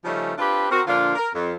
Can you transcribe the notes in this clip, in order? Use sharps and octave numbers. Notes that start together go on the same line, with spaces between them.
C#3 F3 G3 A3 C#4 D#4
C4 D4 F4 G4 B4
C4 F#4 A#4
A#2 D3 F3 D4 F4
A#4
F2